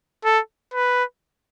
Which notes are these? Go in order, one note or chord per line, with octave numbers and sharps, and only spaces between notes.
A4
B4